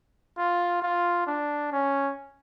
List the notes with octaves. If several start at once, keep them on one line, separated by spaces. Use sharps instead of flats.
F4
F4
D4
C#4